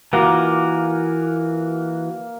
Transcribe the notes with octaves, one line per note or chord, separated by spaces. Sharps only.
E3 A#3 F4 F#4